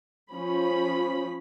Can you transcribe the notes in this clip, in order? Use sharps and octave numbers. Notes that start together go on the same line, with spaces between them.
F3 C#4 B5